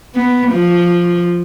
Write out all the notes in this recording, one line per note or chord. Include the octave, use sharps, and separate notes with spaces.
B3
F3